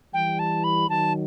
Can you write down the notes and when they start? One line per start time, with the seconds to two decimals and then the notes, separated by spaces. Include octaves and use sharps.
0.13 E3 G3 G5
0.39 A5
0.64 B5
0.89 D#3 F#3 A5